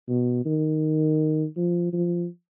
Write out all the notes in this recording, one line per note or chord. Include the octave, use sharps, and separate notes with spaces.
B2
D#3
F3
F3